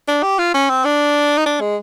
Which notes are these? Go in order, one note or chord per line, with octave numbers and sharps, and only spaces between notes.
D4
G4
F4
C#4
C4
D4
D#4
D4
G#3